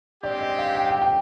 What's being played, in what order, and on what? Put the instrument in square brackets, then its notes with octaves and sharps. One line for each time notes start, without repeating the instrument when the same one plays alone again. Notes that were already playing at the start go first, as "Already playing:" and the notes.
[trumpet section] G#3 C4 G4 [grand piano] D5
[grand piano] D#5
F5
G5
G5
G5